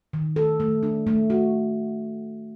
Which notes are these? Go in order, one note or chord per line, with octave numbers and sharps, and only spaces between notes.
D#3
A4
A3
D4
A3
F#4